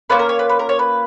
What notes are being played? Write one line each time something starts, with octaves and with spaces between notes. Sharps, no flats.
A#3 C#4 F4 B4
A#4
C#5
B4
B4
A#4
C#5
B4